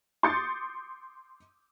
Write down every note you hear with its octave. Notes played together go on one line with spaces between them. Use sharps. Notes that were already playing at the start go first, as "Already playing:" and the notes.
C6 D6 D#6 G6 A6 C#7